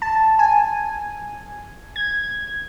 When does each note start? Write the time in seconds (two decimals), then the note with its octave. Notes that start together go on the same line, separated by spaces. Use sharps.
0.02 A5
0.39 G#5
1.96 G#6